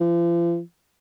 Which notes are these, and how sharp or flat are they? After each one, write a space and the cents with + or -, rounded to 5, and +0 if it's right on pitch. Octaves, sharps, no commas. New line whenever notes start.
F3 -40